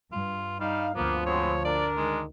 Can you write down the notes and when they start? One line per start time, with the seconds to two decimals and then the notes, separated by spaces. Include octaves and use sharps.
0.12 G2 F4
0.60 G3 D#4 F5
0.95 D2 F3 A#3 B3
1.26 G#3 B3 C4 C#5
1.65 D4 A#4 D5
1.97 D#3 G#3